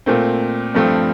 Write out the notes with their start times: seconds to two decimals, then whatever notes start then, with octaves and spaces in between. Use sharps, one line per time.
0.06 A#2 A3 C4
0.74 G2 F3 A3 C4